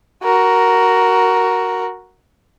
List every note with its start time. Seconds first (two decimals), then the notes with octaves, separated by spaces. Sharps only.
0.23 F#4 A#4